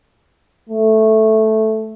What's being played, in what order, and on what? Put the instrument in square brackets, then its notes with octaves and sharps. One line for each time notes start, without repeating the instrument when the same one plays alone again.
[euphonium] A3